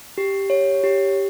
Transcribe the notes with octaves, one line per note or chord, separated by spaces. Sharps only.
G4
C#5
G4